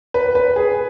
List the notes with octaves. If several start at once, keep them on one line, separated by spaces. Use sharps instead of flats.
B4
B4
G#4